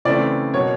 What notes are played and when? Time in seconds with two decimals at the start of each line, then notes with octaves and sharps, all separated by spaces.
0.05 C#3 E3 A3 C4 D5
0.54 B2 F#3 A#3 C#5